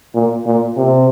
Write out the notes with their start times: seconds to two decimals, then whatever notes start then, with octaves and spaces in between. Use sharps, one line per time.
0.14 A#2
0.46 A#2
0.77 C3